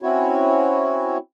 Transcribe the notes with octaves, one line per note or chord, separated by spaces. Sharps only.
C4 C#4 E4 F#4 C#5